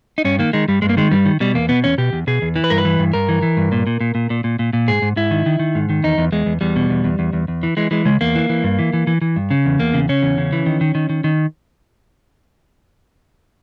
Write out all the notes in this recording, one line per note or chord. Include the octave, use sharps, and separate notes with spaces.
D#4
G2 C#4
D#3 A#3
D#3 G#3
G2 G3
G2 G#3
A#3
D#3 G#3
G2 G3
D#3
B2 G3
E2 A#3
B2 B3
E2 C#4
B2 G4
E2
B2 G#4
E2
E3
B4
G2 A#4
B4
E3
G2
G2 A#4
E3
E3
G2
A#2
A#2
A#2
A#2
A#2
A#2
A#2
A#2
G#2 G#4
G#2
G#2 E4
D#3
D#3
D#3
G#2
D#3
E2 D#4
E2
E2 G#3
E2
E2 G3
B2
E2
E2
E2
E2
E2
E3
E3 G#3
E3 G#3
C#3 G#3
E2 A#3
E3
E3
G2
E3
E3
E3
E3
G2
C#3
E2
E2 A#3
C#3
C#3 C#4
E2
C#3
E3
D#3
D#3
D#3
D#3
D#3